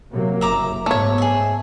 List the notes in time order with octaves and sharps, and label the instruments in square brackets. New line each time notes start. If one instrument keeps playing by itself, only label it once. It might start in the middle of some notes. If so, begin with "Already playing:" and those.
[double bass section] C3 F#3 A#3
[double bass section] F#1 [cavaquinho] E5 A#5 D6
[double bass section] G#2 B3 [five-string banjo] A3 C#5
[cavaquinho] G#4 E5